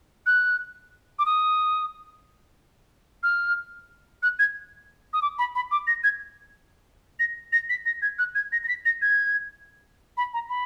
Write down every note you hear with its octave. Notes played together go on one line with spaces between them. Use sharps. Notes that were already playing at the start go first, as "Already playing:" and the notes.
F#6
D6
D#6
F6
F#6
G#6
D#6
D6
B5
B5
D6
A#6
G#6
A#6
A#6
B6
A#6
G#6
F#6
G#6
A#6
A#6
B6
A#6
G#6
B5
A#5
B5